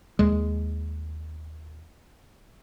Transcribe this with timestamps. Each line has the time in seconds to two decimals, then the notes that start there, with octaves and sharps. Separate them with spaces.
0.19 D#2 G#3